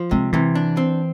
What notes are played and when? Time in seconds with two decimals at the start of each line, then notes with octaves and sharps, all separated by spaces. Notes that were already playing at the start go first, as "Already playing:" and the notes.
Already playing: F3
0.11 C3 G#3
0.33 C3 E3
0.55 D4
0.77 C4